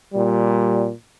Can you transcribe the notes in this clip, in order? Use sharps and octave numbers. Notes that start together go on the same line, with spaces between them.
A#2 G3